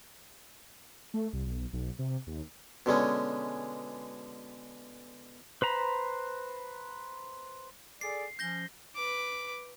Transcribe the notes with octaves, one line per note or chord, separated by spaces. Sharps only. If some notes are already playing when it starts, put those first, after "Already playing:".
A3
C2
B1
B1
C3
D#2
B2 D3 G#3 C#4
B4 C5 A#5 B5
G#4 A4 D5 C7
F3 C#4 G6 A#6 G7
B4 D6